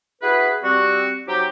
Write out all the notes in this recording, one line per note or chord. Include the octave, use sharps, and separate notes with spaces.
E4 F#4 G#4 B4
G3 C4 F#4
F#3 C4 D#4 G4